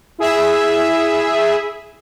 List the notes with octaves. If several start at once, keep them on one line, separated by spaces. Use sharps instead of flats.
E4 G#4 E5